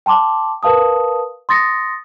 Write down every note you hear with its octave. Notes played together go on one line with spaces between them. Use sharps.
G5 A5 C6 D6
A#4 B4 F5 A5 D#6
C6 D#6 A6 A#6 C#7